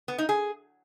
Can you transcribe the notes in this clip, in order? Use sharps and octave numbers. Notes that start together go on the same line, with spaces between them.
B3
D#4
G#4